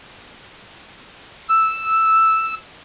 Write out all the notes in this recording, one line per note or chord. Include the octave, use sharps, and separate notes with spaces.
E6